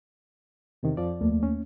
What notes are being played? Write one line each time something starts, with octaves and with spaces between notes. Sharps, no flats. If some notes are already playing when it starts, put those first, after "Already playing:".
E2 C3 D#3
F2 F3 D5
D#2 A3 A#3
C#4